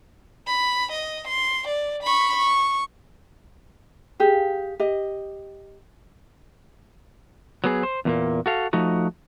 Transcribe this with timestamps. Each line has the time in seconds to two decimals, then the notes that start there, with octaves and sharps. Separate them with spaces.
0.47 B5
0.92 D#5
1.28 C6
1.68 D5
2.03 B5 C#6
2.36 C#6
4.20 G4 G#4 F5
4.80 G4 D#5
7.64 F#3 B3 G#4
7.83 C5
8.05 E2 A#2 A#3
8.46 F#4 A4 F5
8.73 F3 A3 D#4 F#4